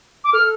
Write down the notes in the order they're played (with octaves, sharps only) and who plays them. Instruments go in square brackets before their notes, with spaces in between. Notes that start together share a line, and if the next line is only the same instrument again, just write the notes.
[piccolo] D6
[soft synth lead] A4 [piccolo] F6